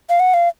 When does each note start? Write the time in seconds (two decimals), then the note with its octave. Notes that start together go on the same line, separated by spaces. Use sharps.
0.10 F5
0.20 F#5
0.34 F5